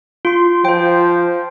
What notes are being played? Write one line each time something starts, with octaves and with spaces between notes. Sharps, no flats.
F4 C6
F3 C5 G5